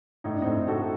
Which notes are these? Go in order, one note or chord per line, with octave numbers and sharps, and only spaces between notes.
A2 D#4
D4
A2 C4 D#4
A2 F#4 A4